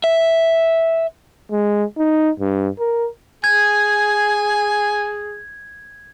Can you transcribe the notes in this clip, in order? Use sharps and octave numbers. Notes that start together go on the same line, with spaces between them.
E5
G#3
D#4
G2
A#4
G#4 G#5 G#6